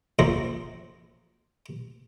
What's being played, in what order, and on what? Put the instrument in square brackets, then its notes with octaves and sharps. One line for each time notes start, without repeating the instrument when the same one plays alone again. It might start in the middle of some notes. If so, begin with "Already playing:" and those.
[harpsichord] A#1 F#2 F3 A#3 C5 D#5